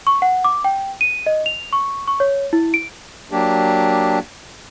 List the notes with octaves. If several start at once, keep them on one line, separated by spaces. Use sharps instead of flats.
C#6
F#5
D6
G5
D#7
D#5
F7
C#6
C#6
C#5
E4
D7
F#3 A#3 D4 G4